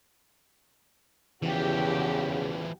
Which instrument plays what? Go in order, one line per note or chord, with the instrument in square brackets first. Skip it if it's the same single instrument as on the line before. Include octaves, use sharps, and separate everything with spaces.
[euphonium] E2 [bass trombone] C#3 [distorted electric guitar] E3 F3 [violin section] F#4 G4